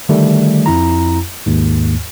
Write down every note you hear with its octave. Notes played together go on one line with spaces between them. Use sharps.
D3 D#3 G3 A3
F2 E4 A#5
D#2 G#2